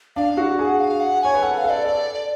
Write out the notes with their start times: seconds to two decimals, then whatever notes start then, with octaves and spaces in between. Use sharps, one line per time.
0.16 D4 F5
0.37 F#4 F#5
0.59 G#4 F#5
0.79 F5
1.00 F#5
1.22 C#5 G#5
1.34 B4
1.42 A4 F#5
1.57 F5
1.64 A4
1.70 D5
1.85 A4